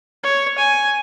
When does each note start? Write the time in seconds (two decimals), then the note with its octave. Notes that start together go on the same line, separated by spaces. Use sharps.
0.23 C#5
0.58 G#5